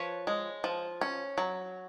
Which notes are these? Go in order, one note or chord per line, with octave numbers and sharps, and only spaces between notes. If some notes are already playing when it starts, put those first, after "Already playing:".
Already playing: F3 B4 C#5
G#3
F3
C#4
F#3